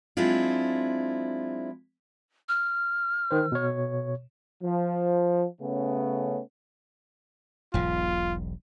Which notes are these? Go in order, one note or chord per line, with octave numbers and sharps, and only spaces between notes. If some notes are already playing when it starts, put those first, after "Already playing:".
F#3 G#3 C4 D4 E4 F4
F6
D#3 C5
B2 C#5
F3
C#3 A3 B3 C#4
E1 B1 G#2 F4